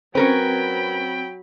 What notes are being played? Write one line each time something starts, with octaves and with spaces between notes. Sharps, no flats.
F#3 C4 C#4 A#4 B4 G5 B5